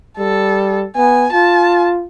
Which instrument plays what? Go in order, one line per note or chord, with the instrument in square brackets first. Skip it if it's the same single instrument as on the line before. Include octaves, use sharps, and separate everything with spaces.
[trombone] G3 [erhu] A4
[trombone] B3 [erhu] G#5
[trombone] F4 [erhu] A5